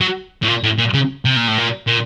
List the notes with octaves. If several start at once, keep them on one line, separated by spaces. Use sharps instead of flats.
F#3
A2
A#2
A2
A#2
C#3
C3
A#2
A2
A#2
A#2